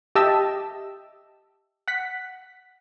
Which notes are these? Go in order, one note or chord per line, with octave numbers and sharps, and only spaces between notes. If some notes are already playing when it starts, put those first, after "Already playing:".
G4 D#5 E5 A5 E6
F#5 B6